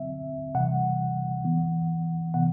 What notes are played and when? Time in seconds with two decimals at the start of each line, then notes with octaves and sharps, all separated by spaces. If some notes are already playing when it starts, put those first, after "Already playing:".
Already playing: D3 F#3 C4 E5
0.55 C3 E3 G3 F#5
1.44 E3 B3
2.34 C3 E3 B3 F#5